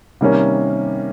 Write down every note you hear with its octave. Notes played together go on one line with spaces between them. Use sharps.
C3 D#3 G3 A#3 C#4